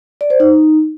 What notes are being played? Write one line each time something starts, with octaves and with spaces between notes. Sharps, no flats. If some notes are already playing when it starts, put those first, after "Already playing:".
D5
C5
D#4